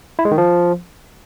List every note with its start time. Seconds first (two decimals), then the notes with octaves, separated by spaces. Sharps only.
0.19 E4
0.25 G#3
0.31 D#3
0.38 F3